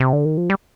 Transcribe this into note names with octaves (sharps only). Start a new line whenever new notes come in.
C3
D3
D#3
F3
G3